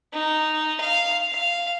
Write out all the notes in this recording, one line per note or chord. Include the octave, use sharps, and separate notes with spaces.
D#4
F5
F5